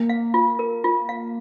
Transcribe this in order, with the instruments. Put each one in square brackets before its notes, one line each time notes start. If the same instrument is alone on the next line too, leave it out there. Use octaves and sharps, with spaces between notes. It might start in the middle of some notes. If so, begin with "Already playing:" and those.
Already playing: [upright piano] A#3
[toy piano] F5
F4
A#4
F4
F5